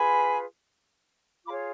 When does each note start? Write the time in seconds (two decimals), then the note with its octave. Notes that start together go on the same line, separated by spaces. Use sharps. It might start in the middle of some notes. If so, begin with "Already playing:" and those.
Already playing: F4 G#4 B4 G#5 B5
1.46 F4 G#4 C#5 B5 D6